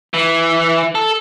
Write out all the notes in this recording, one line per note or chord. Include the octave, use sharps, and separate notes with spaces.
E3
A4